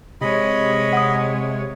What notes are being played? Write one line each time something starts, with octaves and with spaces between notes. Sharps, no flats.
C3 G#3 C#5 D#5 B5
F#5 D#6